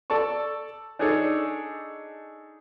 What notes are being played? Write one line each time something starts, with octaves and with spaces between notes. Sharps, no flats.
A4 D5 A5 C#6
D4 D#4 G#4 A4 C#5 D5